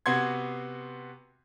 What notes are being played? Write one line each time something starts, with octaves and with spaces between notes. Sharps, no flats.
C3 B3 F#4 C6 G#6